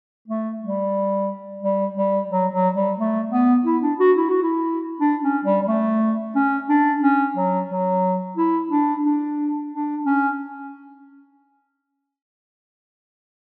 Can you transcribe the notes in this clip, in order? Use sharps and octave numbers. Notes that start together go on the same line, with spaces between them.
A3
G3
G3
G3
F#3
F#3
G3
A3
B3
E4
D4
F#4
E4
F#4
E4
D4
C#4
G3
G3
A3
C#4
D4
C#4
F#3
F#3
E4
D4
D4
D4
C#4